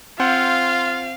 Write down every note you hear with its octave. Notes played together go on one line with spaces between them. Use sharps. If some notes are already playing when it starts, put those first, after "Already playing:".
C4 F4 C5 F5 F#5